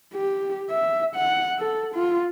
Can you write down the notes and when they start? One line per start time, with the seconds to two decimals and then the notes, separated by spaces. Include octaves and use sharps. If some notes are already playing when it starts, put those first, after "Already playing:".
0.14 G4
0.70 E5
1.15 F#5
1.59 A4
1.95 F4